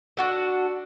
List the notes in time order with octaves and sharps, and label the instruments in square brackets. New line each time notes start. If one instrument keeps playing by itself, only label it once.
[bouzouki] D4 F#4 A4